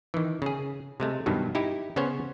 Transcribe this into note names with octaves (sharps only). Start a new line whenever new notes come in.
D#3 E3
C#3 G#4
C3 G#3 A3
G2 B2 D#3 F#3
D#4 E4 G4
C#3 B3 C#4 C5 C#5